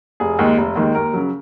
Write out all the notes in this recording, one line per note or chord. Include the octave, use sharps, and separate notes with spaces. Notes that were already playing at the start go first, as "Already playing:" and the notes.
F1 G#4
D#2 D#3 G#3
F1
D#2 D#3 G#3
D#2 A#4
C#3 F#3